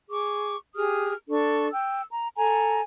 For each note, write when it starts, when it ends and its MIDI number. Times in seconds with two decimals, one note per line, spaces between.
0.09 0.56 68
0.09 0.56 85
0.09 0.56 86
0.75 1.13 67
0.75 1.13 68
0.75 1.13 87
0.75 1.13 89
1.30 1.68 62
1.30 1.68 69
1.30 1.68 85
1.72 2.03 79
1.72 2.03 88
2.10 2.27 82
2.36 2.81 69
2.36 2.81 80
2.36 2.81 82